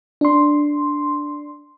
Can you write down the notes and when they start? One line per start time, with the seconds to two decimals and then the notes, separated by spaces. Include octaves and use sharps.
0.21 D4 C6